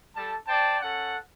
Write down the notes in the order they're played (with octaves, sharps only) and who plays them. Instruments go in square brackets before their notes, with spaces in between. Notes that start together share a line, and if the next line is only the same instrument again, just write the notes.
[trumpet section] G3 A4 A5
C5 D5 G5 A5
C#4 A4 F#5